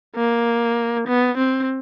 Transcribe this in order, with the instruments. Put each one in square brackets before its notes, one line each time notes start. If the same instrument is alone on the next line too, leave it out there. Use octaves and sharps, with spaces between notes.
[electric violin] A#3
B3
C4